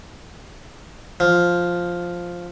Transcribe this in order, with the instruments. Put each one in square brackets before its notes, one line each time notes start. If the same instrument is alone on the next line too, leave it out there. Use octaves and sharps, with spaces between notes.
[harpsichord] F3